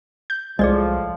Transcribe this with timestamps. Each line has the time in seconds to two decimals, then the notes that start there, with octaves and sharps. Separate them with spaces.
0.30 G6
0.59 C2 A2 F3 G#3 G#4 D5 D#5